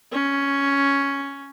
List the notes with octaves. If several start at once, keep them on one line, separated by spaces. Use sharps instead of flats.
C#4